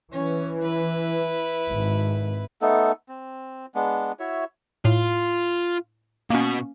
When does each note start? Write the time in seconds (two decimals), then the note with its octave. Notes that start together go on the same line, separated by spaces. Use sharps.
0.12 E3 C#4
0.60 E4 B4
1.71 G#1
2.62 A3 B3 D#4 A4
3.09 C4
3.75 G#3 B3 D4
4.20 E4 F#4 C#5 E5
4.85 A2 F4
6.30 B2 A#3 C#4 F#4